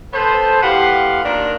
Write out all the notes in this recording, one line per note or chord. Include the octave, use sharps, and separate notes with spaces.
B3 A4 B4 C5
A2 G4 B4 F5 F#5 C6
D#3 A#3 D4 F4 A#4